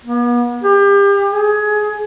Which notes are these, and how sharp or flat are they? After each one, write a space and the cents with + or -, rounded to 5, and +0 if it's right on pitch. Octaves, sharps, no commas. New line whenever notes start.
B3 -40
G4 +35
G#4 +20